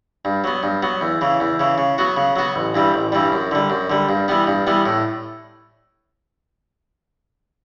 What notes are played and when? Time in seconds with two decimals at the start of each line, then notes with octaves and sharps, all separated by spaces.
0.25 G2
0.44 F#3 B3
0.63 G2
0.83 F#3 B3
1.01 E2
1.21 C#3 E3
1.40 E2
1.60 C#3 E3
1.78 C#3
1.98 F#3 B3 F#4
2.17 C#3
2.36 F#3 B3 F#4
2.55 A1
2.74 G2 E3 G3
2.94 A1
3.12 G2 E3 G3
3.32 F#2
3.51 D3 G3
3.70 F#2
3.90 D3 G3
4.09 G2
4.28 E3 G3 B3
4.47 G2
4.67 E3 G3 B3
4.86 A2